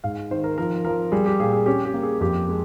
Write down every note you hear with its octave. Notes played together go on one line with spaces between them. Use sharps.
G#2 F5
D#3 C5
A#4
F3 A#4
F3 A#4
G3 G#4
G4
A#2 G#4
G#4
C#4 G4
G4
A#3
G#4
F2 G4
G#3